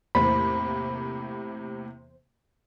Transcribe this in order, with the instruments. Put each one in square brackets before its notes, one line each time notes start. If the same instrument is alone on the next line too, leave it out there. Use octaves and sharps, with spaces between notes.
[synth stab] E2 C5 [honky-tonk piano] A2 C3 A#3 [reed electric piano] B5